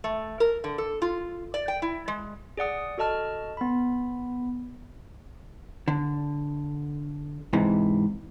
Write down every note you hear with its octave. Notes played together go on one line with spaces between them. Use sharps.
A3
A#4
D3
A4
F4
D5
G5
E4
G#3
G#4 D5 F#5 D#6
F#4 A4 D#5 A5 F6
B3 B5
D3
G#2 C3 E3